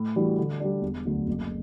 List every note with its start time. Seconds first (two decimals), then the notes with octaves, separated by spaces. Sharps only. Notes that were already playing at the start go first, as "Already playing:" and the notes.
Already playing: A2
0.16 E3 G3 D4 F#4
0.38 D3
0.60 G3 D4
0.82 E1
1.05 D2 D3 F#3
1.27 F#1